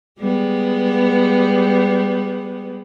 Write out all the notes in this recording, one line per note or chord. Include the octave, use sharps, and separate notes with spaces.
G3 G#3 B3